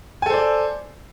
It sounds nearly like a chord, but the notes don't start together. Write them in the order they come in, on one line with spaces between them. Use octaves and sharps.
G#5 A4 C5 D5